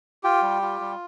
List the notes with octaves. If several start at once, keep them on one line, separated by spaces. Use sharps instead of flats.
F4 G4 G5
G3
F4
G3